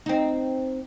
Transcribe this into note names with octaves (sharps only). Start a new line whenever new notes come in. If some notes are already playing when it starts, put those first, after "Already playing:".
C4 D#4